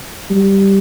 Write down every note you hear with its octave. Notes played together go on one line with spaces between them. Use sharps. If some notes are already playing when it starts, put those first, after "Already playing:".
G3